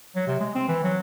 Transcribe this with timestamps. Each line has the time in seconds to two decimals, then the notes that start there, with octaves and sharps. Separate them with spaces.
0.16 F#3
0.28 C3
0.40 G#3
0.55 C4
0.68 E3
0.84 F#3